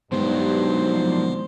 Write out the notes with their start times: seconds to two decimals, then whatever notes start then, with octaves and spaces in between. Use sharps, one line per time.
0.12 G2 D#3 F#3 G#3 B3 C5
0.88 F3 A#3 D4